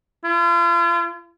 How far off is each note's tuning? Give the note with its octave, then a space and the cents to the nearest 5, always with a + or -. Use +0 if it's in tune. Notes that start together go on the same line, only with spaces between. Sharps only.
F4 -40